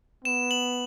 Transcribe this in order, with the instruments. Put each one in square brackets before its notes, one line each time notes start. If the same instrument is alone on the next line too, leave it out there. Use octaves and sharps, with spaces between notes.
[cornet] B3 [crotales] E7
[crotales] F#7